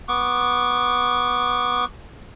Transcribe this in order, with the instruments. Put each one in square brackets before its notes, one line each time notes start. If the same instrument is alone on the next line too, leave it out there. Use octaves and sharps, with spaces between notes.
[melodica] B3 C#6 D6